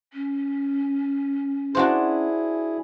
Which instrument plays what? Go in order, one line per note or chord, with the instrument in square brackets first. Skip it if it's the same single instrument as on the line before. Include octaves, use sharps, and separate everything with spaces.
[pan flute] C#4
[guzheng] D4 F#4 C5 [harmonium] E4 G#4